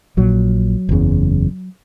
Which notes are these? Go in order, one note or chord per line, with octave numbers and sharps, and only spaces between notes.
A#1 A#2 F#3
F#1 E2 C#3